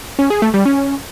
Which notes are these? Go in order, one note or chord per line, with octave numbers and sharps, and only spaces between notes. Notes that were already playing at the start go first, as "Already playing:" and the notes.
C#4
G#4
A3
G3
C#4